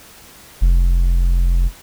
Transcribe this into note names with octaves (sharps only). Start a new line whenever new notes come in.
F1